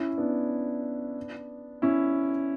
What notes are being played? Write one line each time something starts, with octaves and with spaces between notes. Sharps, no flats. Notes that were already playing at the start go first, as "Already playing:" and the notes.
Already playing: C#4 E4
B3 D4
C#4 E4